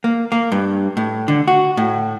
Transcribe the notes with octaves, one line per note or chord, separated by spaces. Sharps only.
A#3
A#3
G2
A2
D3
F#4
A2